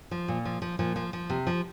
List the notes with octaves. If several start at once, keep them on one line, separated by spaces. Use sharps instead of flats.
F3
A#2
F3
F3
A#2 F3
F3
F3
C3
F3